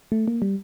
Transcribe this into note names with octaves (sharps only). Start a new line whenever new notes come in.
A3
A#3
G3